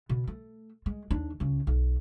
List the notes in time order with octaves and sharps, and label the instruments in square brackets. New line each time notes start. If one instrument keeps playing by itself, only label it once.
[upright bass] B2
A3
G#3
D#2 D4
C#2 C#4
B1